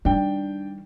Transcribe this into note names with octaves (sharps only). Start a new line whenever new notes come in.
D#3 G3 D4 G5